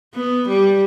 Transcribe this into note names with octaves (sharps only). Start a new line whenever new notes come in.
B3
G3